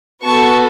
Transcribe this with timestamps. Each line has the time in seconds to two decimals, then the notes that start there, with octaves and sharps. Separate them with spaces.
0.24 B3 F#4 A4 A5 C#6